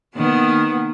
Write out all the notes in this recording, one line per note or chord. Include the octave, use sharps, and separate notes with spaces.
D#3 A#3 B3